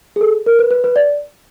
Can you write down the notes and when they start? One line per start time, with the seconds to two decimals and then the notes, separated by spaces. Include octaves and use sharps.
0.16 G#4
0.21 A4
0.46 A#4
0.59 B4
0.71 B4
0.84 B4
0.96 D5